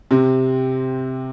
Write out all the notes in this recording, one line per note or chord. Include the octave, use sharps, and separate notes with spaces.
C3 C4